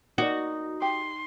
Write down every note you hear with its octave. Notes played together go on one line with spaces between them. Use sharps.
A#3 D#4 F#4 D5
G4 C6